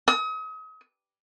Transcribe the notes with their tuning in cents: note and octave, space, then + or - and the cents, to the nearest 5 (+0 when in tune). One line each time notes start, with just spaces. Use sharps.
D#6 +35